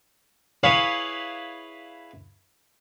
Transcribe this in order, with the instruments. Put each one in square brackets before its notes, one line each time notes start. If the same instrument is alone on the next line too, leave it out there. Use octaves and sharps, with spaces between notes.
[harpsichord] E4 G#4 B4 C#5 F5